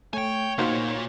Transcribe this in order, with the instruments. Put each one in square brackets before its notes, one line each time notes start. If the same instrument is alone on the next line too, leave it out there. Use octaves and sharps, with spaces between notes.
[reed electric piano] A3 [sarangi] C#5 [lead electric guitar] G5 G#5
[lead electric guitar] C#2 A#2 [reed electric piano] A#3 D#4 F#4 [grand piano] C5 F5